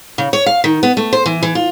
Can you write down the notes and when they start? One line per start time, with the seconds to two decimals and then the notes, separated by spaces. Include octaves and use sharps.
0.18 C#3
0.33 C#5
0.46 F5
0.64 D#3
0.83 B3
0.97 A3
1.13 C5
1.26 E3
1.43 E3
1.55 F4